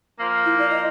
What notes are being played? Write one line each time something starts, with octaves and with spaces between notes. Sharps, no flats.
F3 A#3
E4
D5
D#5